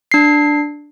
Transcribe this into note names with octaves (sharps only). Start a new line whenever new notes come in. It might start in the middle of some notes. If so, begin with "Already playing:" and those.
D4 C7